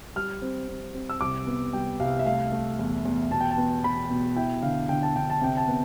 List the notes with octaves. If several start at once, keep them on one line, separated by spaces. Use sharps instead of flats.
G3 F6
C4
C4
C4
E6
C2 D6
B3
G3 G5
C2 F5
E5
A3 F5
A3
E2
E2
B2 A5
G5
A5
B3
B3 B5
B2
E4 G5
D3 F5
D3 G5
A5
D3 G5
A5
C3 G5
A5
B3